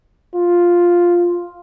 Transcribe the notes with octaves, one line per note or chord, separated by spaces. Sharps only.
F4